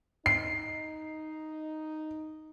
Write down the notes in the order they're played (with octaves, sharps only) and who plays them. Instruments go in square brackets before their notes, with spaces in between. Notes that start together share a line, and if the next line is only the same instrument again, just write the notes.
[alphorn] D#4 [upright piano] C7